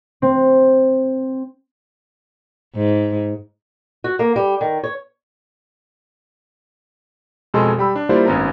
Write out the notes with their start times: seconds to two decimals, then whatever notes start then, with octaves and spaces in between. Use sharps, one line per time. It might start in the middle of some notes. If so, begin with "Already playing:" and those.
0.22 C4
2.76 G#2
4.04 F#4
4.19 A#3
4.36 G3
4.61 D#3
4.83 C#5
7.54 F2 B2 G#3 A4 G#5 C6
7.78 G3 G5 B5 E6
7.96 D4
8.09 G3 A#3 E4 F4 C5 D5
8.26 G#1 F#2 B3 C#4 A#5